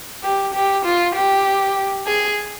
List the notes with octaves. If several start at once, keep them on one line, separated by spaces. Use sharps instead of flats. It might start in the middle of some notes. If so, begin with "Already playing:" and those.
G4
G4
F4
G4
G#4